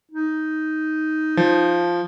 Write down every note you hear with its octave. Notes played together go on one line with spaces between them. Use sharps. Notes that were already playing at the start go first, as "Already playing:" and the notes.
D#4
F3